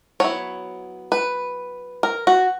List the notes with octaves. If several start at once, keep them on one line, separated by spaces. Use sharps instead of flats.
F#3 B3 E4 C#5
B4
A#4
F#4